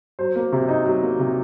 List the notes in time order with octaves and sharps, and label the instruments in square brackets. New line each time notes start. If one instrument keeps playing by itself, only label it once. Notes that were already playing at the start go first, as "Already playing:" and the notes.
[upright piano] F#3 C5
A#3
C3
D#4
F#3
A#3
C3